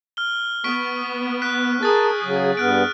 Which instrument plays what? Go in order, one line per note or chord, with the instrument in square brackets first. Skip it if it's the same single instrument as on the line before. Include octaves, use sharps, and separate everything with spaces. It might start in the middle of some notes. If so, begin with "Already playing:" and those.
[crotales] F6 G7
[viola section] B3 [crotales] C#6 B6 D7
[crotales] F#6 B6 D7
[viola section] G#4 [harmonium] A#4 A5 [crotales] D#6 F6 A6
[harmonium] C#3 F#3
[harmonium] G2 B3 [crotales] F6 F#6 D7